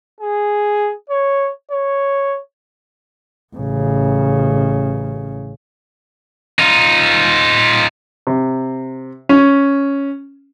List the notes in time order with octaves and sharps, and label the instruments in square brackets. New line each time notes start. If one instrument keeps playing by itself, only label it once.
[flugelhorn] G#4
C#5
C#5
[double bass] A1 C#3
[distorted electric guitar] D#4 F4
[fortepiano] C3
C#4